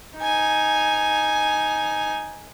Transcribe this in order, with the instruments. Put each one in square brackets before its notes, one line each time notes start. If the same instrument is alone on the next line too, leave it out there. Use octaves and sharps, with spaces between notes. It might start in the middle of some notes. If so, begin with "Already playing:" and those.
[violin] D#4 G#5